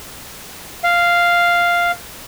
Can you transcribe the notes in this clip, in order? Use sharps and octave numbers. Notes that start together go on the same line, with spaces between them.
F5